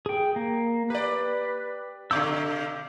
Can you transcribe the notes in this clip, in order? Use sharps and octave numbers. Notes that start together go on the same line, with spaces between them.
G#4 G5
A#3
G4 B4 D5
B2 D3 F5 D6 E6